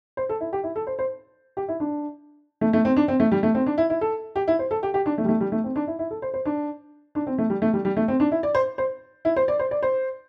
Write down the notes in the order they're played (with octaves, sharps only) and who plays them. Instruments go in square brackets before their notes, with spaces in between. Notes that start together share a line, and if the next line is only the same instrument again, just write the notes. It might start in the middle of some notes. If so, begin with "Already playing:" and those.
[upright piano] C5
A4
E4
G4
E4
A4
C5
C5
G4
E4
D4
A3
A3
C4
D4
C4
A3
G3
A3
C4
D4
E4
E4
A4
G4
E4
C5
A4
G4
G4
D4
A3
G3
A3
G3
A3
C4
D4
E4
E4
A4
C5
C5
D4
D4
C4
A3
G3
A3
G3
G3
A3
C4
D4
E4
D5
C5
C5
E4
C5
D5
C5
D5
C5